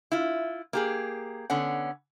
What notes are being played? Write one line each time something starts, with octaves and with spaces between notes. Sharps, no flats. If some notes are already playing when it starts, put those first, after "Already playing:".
E4 F4
A#3 G4 G#4
D3 B3 C#4 F#5